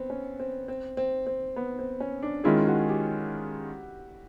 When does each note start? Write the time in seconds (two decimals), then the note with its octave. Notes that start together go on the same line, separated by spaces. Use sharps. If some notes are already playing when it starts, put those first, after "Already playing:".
Already playing: B3 C4
0.10 C#4
0.40 C4
0.68 C4
0.97 C4
1.26 C4
1.56 B3
1.79 C4
2.00 C#4
2.22 D4
2.44 D#3 G#3 C#4 E4 F4 G#4
2.67 F#4
2.89 G4